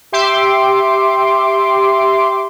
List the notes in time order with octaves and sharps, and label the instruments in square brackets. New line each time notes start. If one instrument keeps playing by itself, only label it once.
[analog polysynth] G4 E5 C6 D6